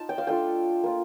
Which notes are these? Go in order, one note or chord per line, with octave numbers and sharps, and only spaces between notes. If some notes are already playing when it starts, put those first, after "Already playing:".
Already playing: D#4 F4 A5
G5
F5
A3 D4 F4 G5
A#3 F4